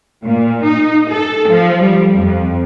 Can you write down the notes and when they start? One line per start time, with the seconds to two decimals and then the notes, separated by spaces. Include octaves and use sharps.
0.25 A#2
0.64 D#4
1.11 A4
1.48 F3
1.82 G3
2.15 F2